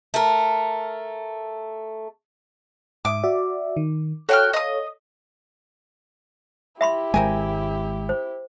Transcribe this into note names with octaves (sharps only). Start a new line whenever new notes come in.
A3 A#4
G#2 E5 D6 D#6
F#4 D5 E5
D#3
F#4 A4 C#5 F5 G5 F6
D#5 D#6
E4 G4 E5 B5 C6
G#1 G#3 C4 A#4 G#5
C5